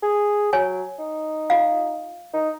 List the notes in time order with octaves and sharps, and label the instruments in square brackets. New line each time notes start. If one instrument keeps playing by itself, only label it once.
[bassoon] G#4
[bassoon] F#3 [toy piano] C#5 G#5
[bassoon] D#4
[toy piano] F4 F5
[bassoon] D#4